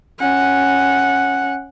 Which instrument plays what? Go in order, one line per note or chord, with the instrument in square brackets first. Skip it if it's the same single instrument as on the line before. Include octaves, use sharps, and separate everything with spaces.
[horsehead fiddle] C#4 F#5